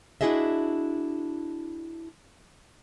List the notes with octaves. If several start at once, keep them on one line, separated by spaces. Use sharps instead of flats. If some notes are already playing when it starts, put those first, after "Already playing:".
D4 E4 F#4 G#4 D#5 E5